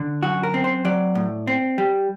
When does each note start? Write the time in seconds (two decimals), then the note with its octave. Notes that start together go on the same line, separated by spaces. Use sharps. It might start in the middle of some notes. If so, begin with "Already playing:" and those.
Already playing: D3
0.23 F#2 F#4
0.43 A#4
0.54 C4
0.64 C5
0.85 F#3 D5
1.15 A2
1.47 C4
1.78 G3